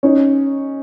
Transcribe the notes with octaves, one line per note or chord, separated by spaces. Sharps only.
C#4 D#4